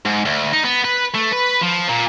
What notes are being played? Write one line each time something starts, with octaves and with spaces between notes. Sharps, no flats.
G#2
D2
D#4
B3
B4
A3
B4
F3
A#2